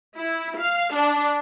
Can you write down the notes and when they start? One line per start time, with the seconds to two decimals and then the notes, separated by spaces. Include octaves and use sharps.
0.17 E4
0.57 F5
0.94 D4